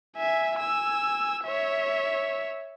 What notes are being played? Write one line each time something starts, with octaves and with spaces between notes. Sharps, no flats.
E5 G#5
G#5 E6
C#5 E5